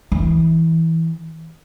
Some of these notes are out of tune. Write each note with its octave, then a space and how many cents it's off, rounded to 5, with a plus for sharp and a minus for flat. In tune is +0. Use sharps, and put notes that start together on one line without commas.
E3 -20